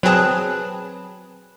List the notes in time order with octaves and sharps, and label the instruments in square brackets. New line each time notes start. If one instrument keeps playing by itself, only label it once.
[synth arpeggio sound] F#3 C4 G#4 [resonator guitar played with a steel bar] B4 A5